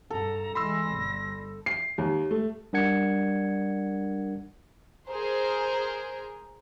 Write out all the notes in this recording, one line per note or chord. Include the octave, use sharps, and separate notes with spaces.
G2 A4 A#5
E3 G#3 B5 C6 E6 A#6
G1 G3
C7
D#2
A3
G3 D4 A#4 F#5 G#6 C#7
G#4 A#4 C5